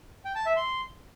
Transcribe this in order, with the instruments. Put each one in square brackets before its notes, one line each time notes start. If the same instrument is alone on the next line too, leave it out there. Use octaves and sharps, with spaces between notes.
[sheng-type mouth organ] G5
A5
E5
C6